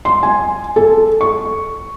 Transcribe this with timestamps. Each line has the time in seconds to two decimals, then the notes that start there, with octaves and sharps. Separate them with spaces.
0.05 C6
0.23 G#5
0.76 A4
1.21 C#6